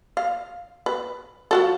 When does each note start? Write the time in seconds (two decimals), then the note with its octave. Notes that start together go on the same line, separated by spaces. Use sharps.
0.17 F5
0.86 B4
1.51 F3 F#4 A4